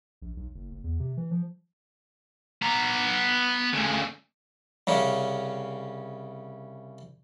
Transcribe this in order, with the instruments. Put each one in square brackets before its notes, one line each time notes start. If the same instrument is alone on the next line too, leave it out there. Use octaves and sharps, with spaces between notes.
[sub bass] A#1
B1
F#1
F#1
E2
C3
E3
F3
[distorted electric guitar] B3 A#5
D2 C#3
[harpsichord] C2 C#3 C#4